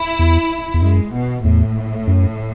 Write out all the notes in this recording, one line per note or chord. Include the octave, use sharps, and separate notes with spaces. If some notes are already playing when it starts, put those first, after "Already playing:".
Already playing: E4
E2
E2
F#2 G#3
B2
E2 A2
F#2